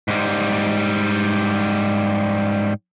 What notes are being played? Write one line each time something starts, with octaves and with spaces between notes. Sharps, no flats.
G#2 G3